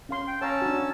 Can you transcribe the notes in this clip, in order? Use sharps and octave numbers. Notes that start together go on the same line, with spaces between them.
C#4 F5 C6
G5
C#4 C#5 F5 A5 A#5 E6
D4 F#4